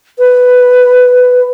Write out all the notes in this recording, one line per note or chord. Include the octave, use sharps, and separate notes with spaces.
B4